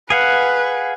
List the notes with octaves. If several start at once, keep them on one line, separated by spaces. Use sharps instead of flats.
G#4 B4 F5 F#5